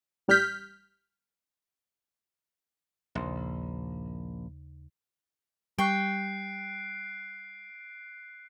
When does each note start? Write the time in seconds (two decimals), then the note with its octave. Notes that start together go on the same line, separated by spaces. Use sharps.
0.28 A1 G3 F6 G6 B6
3.15 A#1 D#2 C#3 C6
5.78 G3 G5 C#6 F#6 C7 D7